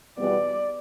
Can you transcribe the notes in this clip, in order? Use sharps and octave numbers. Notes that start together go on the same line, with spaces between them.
E2 B2 G3 B3 D5